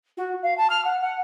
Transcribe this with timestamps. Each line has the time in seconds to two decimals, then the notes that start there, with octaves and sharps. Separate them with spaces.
0.17 F#4
0.43 F5
0.57 A5
0.70 F6
0.84 F#5
1.01 F#5